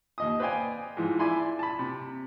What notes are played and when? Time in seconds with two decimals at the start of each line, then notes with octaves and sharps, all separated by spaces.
0.18 D#2 D#5 D#6
0.40 B4 C5 D5 F5 G5 G#5
0.97 G#2 E3 F3
1.19 E4 D5 E5 G#5 B5 C6
1.59 A5 B5
1.79 C3